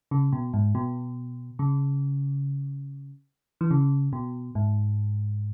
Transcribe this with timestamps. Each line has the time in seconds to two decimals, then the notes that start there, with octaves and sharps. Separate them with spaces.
0.11 C#3
0.32 B2
0.54 G#2
0.75 B2
1.59 C#3
3.61 E3
3.71 C#3
4.13 B2
4.55 G#2